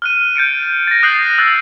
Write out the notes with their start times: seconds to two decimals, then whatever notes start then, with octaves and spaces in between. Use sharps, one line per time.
0.02 F6 F#6 D#7
0.36 G6 A6 C#7 D7
0.63 D#7
0.87 A6 A#6
1.03 D#6 F#6 G6 C7 F#7
1.38 E6 F#6 A6